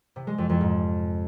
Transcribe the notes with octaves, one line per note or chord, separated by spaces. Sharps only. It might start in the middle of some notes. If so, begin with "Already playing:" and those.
C3
G#3
F2
F2
G#2